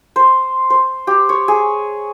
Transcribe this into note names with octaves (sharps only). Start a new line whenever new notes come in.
C5
C5
G4
C#5
G#4